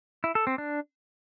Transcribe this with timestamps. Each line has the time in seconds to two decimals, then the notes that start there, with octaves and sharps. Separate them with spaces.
0.24 E4
0.35 A4
0.47 C4
0.58 D4